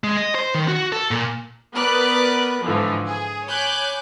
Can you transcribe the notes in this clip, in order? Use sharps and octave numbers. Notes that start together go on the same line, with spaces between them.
G#3
D#5
C5
D#3
F#4
A4
A#2
B3 A#4 B4 D5 D6 F#6
G#2 D3 E3 F3
G#4
C#5 G#5 B5 D6 F#6 G6